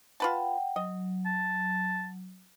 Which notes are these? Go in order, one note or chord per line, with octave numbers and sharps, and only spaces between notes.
F4 B4 F#5 G5 A5
F#3 D#5
A5